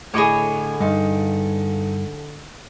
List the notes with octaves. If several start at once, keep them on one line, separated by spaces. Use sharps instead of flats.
A2 D3 G#4 C#5 D#5 B5 D6
G2 D#4